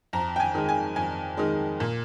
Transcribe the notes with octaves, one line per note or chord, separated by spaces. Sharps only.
F2 A#5
G5
G#5
D#3 G#3
G#5
F2 G#5
D#3 G#3
A#2